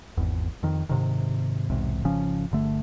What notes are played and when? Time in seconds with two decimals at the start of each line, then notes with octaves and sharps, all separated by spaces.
0.17 G#1 E2
0.63 F2 D#3
0.89 G#2 C3 D#3
1.70 B1 E2 G#2 C3
2.04 G#1 C#3 F3 C#4
2.51 G1 D3 A3